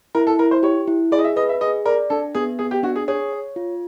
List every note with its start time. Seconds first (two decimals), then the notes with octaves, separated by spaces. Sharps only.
0.15 E4 A#4
0.27 A4
0.39 E4 A#4
0.51 C5
0.63 G4 C#5
0.87 E4
1.12 G#4 D5
1.19 D#5
1.24 E5
1.36 B4 D#5
1.49 E5
1.61 G#4 D#5
1.86 A#4 D5
2.10 D4 A4
2.35 B3 G#4
2.59 B3 G#4
2.71 G4
2.83 D4 F#4
2.96 G#4
3.08 G#4 C#5
3.33 C#5
3.56 F4